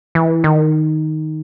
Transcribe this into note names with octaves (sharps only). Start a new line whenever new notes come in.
E3
D#3